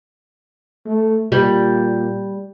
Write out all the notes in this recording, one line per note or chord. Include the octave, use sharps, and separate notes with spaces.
A3
A#2 G3